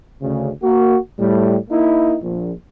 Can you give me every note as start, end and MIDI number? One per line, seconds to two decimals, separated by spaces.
0.21 0.50 38
0.21 0.50 49
0.63 0.97 58
0.63 0.97 66
1.20 1.57 45
1.20 1.57 55
1.70 2.16 58
1.70 2.16 63
1.70 2.16 64
2.22 2.52 34